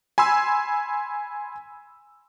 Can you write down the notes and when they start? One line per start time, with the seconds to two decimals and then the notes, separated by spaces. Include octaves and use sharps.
0.18 G#5 B5 C6 E6